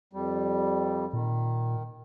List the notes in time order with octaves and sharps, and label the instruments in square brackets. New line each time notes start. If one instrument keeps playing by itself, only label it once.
[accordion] F2 G3
[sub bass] A#2 [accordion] D#3